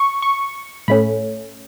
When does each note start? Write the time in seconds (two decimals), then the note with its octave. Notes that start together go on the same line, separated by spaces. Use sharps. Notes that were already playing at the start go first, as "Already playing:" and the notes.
Already playing: C#6
0.22 C#6
0.88 A2 A3 C#4 B5